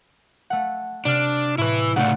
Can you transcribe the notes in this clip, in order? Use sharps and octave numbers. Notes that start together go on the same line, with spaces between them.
A3 F#5
C3 D4 F6
A2 E4 B4
C#3 A3 D#4 D5 F#5